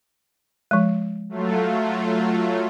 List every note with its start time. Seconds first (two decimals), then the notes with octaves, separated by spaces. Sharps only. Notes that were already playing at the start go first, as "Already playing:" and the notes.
0.71 F3 G#3
1.29 F#3 A3 F4